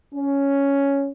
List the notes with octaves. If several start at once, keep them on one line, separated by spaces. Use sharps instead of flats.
C#4